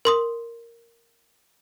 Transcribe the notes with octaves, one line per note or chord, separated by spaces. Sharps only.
A#4 C6 D#6